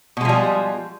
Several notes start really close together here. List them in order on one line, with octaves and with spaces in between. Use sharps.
B2 G#3 F3 G3